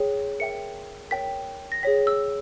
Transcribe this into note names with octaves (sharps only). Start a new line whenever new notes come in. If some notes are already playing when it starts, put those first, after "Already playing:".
Already playing: G#4 C#5 G5
A#4 E5 G5 C#7
A#4 C#5 G5 B6
A#6
G#4 C#5 G5 B6
E6